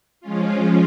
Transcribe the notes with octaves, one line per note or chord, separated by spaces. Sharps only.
F3 G#3 C#4 F4